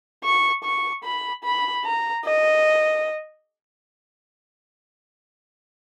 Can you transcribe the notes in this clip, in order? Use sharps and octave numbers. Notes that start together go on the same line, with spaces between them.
C#6
C#6
B5
B5
A#5
D#5